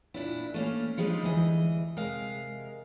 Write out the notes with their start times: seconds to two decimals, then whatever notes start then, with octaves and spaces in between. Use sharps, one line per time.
0.14 A#2 D4 E4
0.54 A3 A#3 C#4
0.98 F3 G3 G#3 D4 D#4 F4
1.22 D2 E3 D#5
1.97 C3 G#3 A#4 F5